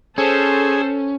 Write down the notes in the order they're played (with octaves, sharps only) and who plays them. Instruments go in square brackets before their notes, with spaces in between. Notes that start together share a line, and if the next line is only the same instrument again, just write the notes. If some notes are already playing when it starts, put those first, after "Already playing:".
[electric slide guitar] C#4 [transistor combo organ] G#4 [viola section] A4 C5